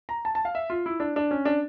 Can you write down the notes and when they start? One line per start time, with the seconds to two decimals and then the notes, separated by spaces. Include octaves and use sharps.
0.09 A#5
0.25 A5
0.35 A5
0.45 F5
0.55 E5
0.70 F4
0.86 E4
1.00 D4
1.16 D4
1.31 C#4
1.45 D4